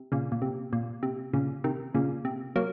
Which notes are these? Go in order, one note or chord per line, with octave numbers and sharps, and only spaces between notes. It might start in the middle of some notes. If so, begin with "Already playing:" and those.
Already playing: C3
A#2 C#3
A#2
C3
A#2
C3
A#2 C#3
C3 D#3
A#2 C#3
C3
F#3 A#3